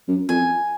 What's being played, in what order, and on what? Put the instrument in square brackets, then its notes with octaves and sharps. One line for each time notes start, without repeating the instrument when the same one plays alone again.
[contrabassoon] F#2
[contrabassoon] F2 [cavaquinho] G#5